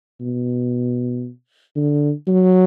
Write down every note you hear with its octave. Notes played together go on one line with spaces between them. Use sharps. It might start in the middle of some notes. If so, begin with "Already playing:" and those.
B2
D3
F#3